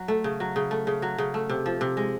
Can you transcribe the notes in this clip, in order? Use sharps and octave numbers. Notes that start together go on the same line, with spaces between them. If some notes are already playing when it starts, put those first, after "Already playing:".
Already playing: F#3
A3
C#3
F#3
C#3
A3
C#3
F#3
C#3
A3
C3
F3
C3
G#3